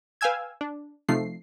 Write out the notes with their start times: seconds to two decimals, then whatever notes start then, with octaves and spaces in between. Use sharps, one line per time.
0.21 B4 F5 G5 G#5 E6 G#6
0.61 D4
1.09 C3 F3 A3 D#4 C7